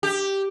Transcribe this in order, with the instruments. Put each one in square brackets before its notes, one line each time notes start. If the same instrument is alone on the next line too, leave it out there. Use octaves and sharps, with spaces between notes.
[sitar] G4